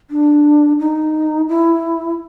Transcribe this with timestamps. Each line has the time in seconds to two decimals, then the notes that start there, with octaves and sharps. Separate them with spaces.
0.10 D4
0.79 D#4
1.49 E4